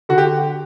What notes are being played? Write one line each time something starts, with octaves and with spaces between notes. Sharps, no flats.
D3 F#4
G4